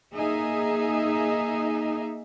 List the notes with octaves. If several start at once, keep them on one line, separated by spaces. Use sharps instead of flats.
A#3 D#4 G#4 E5